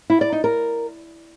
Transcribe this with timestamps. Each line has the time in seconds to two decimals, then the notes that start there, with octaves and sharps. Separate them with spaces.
0.10 E4
0.21 D5
0.32 D#4
0.44 A#4